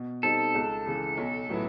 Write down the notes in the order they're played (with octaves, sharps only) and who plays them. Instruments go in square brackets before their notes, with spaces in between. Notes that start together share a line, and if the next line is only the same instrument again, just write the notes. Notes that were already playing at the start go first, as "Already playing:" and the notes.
Already playing: [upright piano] B2
[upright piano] G3 C4 D#4 [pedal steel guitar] A4
[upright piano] C#2
C#3 E3
B1
A2 F#3 B3 E4